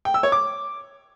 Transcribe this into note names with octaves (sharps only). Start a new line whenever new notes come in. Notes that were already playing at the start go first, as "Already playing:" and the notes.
G5
E6
C#5
D6